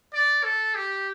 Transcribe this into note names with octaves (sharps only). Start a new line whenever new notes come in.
D5
A4
G4